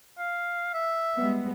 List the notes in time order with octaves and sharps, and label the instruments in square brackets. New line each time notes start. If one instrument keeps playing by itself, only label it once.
[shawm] F5
E5
[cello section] G3 G#3 B3